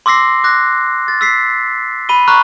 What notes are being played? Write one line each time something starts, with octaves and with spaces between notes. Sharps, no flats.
C6 D6 E6 A#6 C7
D6 F#6 A#6
A6
E6 B6 C7
B5 D#7 G7
A#5 B5 C#6 F6 F#6